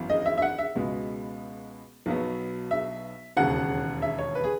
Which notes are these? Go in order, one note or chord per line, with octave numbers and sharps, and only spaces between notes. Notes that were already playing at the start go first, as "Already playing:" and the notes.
Already playing: G#1 F#2 E3 B3
D#5
E5
E5
F#5
E5
C#2 B2 G#3 B3
B1 B2 F#3 B3
E5
E1 D#2 C#3 F#5
E5
C#5
B4
G#4